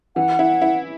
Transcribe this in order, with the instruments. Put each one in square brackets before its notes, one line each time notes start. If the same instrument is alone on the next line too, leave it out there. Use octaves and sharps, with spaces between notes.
[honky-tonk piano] E3 [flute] F#5
[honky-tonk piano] E4
E4